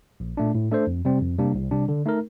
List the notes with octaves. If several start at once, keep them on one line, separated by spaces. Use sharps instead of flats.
A#1
A#2 A3 D4
A2
A3 D4 A4 C5
F2
C3 G3 C4
F2
C3 G3 A#3 D4
C2
C3 G3 D4
D3
A3 D#4 A#4